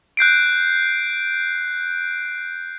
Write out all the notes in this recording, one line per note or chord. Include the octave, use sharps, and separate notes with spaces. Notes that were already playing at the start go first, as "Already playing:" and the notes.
F#6 G6 C7 D7